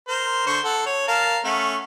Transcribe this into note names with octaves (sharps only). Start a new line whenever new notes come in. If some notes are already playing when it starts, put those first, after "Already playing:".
A#4 C5
D3 C5 C#6
A4 F#5
C#5
A#4 F5 A5
A3 C#4 F#5